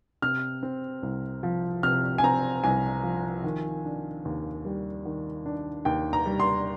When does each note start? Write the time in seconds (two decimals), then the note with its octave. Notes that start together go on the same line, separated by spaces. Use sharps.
0.22 C3 F6
0.63 C4
1.03 C2
1.43 F3
1.83 C3 F6
2.18 G#5
2.23 C4 A#5
2.64 C2 G#5
3.03 F3
3.44 D#3
3.85 D4
4.25 D#2
4.65 G3
5.05 D#3
5.46 D4
5.85 D#2 G5
6.13 A#5
6.26 G3
6.40 C6